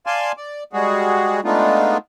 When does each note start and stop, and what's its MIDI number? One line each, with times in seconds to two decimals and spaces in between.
0.06 0.32 74
0.06 0.32 77
0.06 0.32 80
0.06 0.32 81
0.06 0.32 84
0.37 0.64 74
0.73 1.40 55
0.73 1.40 56
0.73 1.40 66
0.73 1.40 68
1.44 1.97 56
1.44 1.97 57
1.44 1.97 59
1.44 1.97 62
1.44 1.97 63
1.44 1.97 65